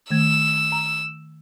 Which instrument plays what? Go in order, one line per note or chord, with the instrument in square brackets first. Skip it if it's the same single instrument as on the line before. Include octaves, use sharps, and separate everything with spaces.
[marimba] D#3 A3 G#6 [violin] E6
[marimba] A#5